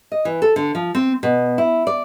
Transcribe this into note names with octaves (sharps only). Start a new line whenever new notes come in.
D#5
E3
A4
D3
F3
C4
B2
E4
D5